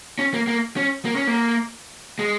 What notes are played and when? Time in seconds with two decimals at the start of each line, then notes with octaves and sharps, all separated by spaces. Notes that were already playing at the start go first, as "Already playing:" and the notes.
0.19 C#4
0.34 A#3
0.47 A#3
0.76 C#4
1.05 A#3
1.16 C#4
1.27 A#3
2.19 G#3